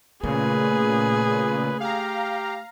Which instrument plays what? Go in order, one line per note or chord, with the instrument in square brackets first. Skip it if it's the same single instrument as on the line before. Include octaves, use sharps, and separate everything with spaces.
[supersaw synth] A#2 C#3 [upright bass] A3 [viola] G#4 [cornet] B4
[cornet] G4 [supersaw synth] F5 A#5